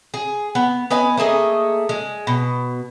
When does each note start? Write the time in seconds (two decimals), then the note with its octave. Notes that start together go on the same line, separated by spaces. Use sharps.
0.14 G#4
0.55 B3
0.90 B3 B4 D#5 G#5
1.17 A3 A#3 G#4 D#5
1.89 G#3
2.27 B2